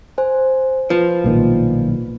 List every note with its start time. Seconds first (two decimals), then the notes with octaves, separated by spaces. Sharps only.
0.18 C5 G#5
0.90 F3 B4
1.24 B1 A#2 D#3